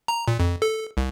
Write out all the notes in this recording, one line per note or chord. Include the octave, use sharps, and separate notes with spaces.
A#5
A#2
F2
A4
C2